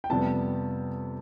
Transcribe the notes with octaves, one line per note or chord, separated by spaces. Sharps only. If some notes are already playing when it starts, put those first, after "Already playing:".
G5
F2 C3 G3 B3 A5